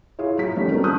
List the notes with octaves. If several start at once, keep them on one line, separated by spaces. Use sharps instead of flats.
E4 F4 G#4 C#5
F#3 B6
D#3 F3 G3 A3 C#4 D#4
F#3 B3 C4 D4 A4 A#4
A5 D#6 F#6 G6